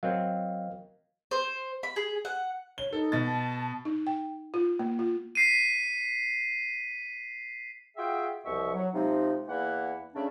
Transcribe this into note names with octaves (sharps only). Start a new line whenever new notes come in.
F#3 C4 A#4 D#5 F5
C5
B5
G#4
F#5
C#5 G7
D#4 A4
B2 A6
A5
D#4
G5
F4
A#3
F4
B6 C7 D#7
F4 F#4 G#4 E5 G5
C2 B2 F3 E5 C#6
F#3
C3 F3 G#3 D#4
E2 E3 A#3 E4 F#5
C#3 A3 C#4 D4 D5 E5